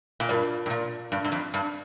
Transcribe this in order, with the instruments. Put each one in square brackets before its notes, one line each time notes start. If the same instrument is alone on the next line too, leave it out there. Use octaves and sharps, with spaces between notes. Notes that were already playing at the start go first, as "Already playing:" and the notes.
[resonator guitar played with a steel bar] A#2
[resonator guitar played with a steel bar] G2 [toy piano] F4 A#4 D5
[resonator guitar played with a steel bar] G2
A#2
G2
G2
F2
G2